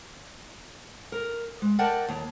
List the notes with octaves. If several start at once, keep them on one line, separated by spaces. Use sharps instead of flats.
A#4
G#3
A#4 D5 D#5 F#5 G5 A5
D#2